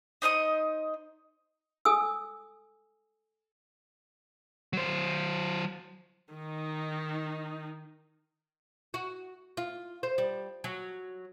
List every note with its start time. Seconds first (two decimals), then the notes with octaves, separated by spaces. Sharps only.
0.22 D#4 C5 D#5 D#6
1.85 A4 G#5 D#6 E6
4.73 F#3 C5
6.34 D#3 D#4
8.94 F#4
9.57 F4
10.03 C5
10.18 G3
10.64 F#3